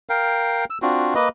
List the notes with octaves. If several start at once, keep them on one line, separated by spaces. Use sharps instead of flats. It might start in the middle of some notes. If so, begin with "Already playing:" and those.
A#4 F5 G5
E6
C4 D4 F4 F#4
A#3 B4 D#5